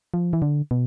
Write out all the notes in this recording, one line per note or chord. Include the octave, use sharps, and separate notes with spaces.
F3
E3
D3
B2